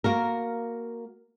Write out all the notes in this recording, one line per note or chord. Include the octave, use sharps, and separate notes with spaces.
A#3 F#4 A#4